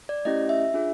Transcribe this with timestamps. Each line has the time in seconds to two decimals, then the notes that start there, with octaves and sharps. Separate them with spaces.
0.09 D5
0.25 A3 C#4 E4 G4 D#5
0.49 E5
0.74 D4 F4 G#4